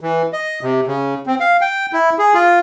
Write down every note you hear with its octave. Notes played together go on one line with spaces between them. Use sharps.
E3
D#5
C3
C#3
C4
F5
G5
E4
G#4
F4